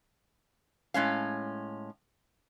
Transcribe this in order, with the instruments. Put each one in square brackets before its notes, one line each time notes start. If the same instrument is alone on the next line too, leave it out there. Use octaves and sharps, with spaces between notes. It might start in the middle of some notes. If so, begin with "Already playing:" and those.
[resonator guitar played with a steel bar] A2 G#3 C#4 F5